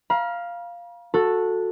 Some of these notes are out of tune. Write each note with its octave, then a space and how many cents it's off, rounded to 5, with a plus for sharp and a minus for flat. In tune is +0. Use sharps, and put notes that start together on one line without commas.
F5 +0 A#5 +45
F#4 -15 A4 +5